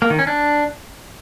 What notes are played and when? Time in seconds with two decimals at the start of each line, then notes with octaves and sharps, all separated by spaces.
0.02 A#3
0.10 D#3
0.19 C#4
0.27 D4